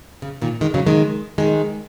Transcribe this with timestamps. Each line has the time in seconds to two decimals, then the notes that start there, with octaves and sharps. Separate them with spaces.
0.22 C#3
0.42 A#2 D#3
0.61 D#3 G#3
0.74 C#3 F#3
0.86 D#3 G#3
1.38 D#3 G#3